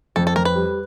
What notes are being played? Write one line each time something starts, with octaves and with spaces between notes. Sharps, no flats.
F2 A4
A4
F2 A#4
B4
G3